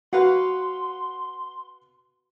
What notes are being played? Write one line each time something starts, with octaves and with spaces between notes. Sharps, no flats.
F#4 B4 F5 F#5 C6